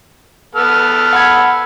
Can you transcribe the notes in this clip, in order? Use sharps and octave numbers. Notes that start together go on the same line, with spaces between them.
B3 A4 F6
F#5 B5 G#6